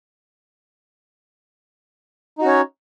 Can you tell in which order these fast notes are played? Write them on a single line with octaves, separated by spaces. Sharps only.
D#4 F#4 C#4 C#5